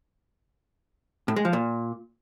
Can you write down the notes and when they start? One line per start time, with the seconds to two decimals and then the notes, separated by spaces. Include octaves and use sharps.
1.28 A2
1.36 G#3
1.45 F3
1.53 A#2